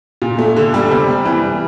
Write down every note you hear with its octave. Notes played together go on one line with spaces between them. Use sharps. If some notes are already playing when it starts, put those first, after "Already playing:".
A#2
A3
D3
G3
C3
G3
E3
G3